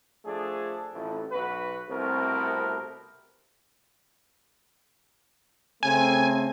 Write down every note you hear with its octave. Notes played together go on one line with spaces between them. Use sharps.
F3 A3 D4 G#4
A1 F2 A2
B1 F#4 B4
C2 B2 A3 C4 A#4
C#3 A3 C4 G#5